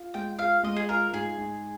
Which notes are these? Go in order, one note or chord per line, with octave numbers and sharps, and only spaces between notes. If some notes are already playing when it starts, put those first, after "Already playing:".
Already playing: F4
G#3 G5
F4 F5
G#3 D#5
G#4
F4 A#4
G#2 G#4
G#2